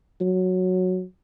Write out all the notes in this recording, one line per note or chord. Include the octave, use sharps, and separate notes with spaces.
F#3